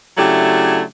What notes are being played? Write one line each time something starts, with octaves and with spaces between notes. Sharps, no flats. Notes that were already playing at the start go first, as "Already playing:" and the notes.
C#3 F#3 A3 D4 E4 G4